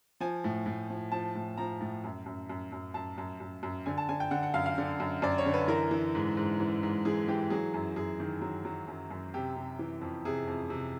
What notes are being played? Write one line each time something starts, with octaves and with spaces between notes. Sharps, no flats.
F3 G#5
A2
A2
F3
F3 A5
A2
F3 A#5
A2
F#2
F#2
F#2
F#2
F#2 A5
F#2
F#2
F#2
D3 G#5
A5
D3 G#5
G5
D3 F#5
F#5
F#2 F5
F5
D3
F#2
F#2 D5
C#5
D3
B4
E3 A#4
E3
G#2
G#2
E3
G#2
E3 G#4
E3 G4
F#3 G#4
F#2
F#2 G#4
D#3
F#3
F#3
F#2
F#2
C3 G4
C3
E3
F2
C3 G#4
F2
C3